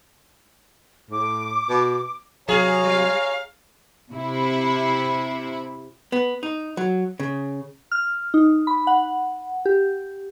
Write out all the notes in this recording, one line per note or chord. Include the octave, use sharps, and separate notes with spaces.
A2 D6
B2
C3 F#3 G#4 C#5 F5 G#5 A#5
G3
C3 E4
B3
D#4
F#3
C#3
F6
D#4
B5
F#5
G4